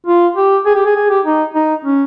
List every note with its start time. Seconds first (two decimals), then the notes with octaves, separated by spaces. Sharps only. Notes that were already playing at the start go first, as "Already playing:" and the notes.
0.07 F4
0.36 G4
0.66 G#4
0.75 G4
0.86 G#4
0.96 G#4
1.10 G4
1.25 D#4
1.54 D#4
1.85 C#4